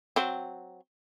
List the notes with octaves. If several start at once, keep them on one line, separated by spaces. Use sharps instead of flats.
F#3 C4